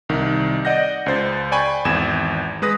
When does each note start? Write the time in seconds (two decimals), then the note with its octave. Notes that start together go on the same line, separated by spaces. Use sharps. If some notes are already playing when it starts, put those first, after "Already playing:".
0.09 C2 D#3
0.65 D5 D#5 F#5 G6 A#6
1.06 C#2 C5 A6
1.52 D5 G5 G#5 B5 C#6
1.85 G#1 E2 G#6 E7
2.62 G#3 B4 D#6 A#6